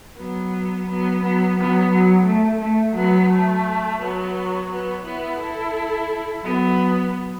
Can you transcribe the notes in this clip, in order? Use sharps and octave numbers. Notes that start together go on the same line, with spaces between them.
F#3 B3
F#3 B3
F#3 B3
F#3 B3
F#3
A3
A3
F#3 B3
A3
F#3 B3
F#3 B3
B3 E4
E4 A4
F#3 B3